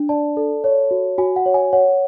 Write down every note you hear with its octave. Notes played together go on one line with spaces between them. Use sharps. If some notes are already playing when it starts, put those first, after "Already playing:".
Already playing: D4
D5 A5
A4
C#5
F#4
F#4 G#5
F#5
C#5
G#5
C#5 F#5